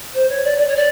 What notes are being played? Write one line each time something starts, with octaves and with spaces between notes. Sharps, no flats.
C5
C#5
D5
D5
C#5
D5